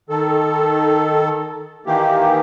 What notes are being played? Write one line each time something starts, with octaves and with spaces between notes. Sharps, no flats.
D#3 A4
D#3 E3 A#3 G4